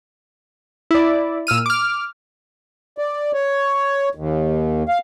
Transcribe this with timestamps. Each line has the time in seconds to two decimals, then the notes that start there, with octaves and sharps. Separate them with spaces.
0.91 E4 D5
1.47 A#2 E6 F6 D#7
1.66 D6 F6
2.98 D5
3.34 C#5
4.15 D#2
4.89 F5